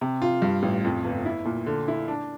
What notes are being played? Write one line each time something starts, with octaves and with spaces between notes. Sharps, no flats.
C3
F4
G2
A1
F2
G1
E4
A#2
D3
E4
D4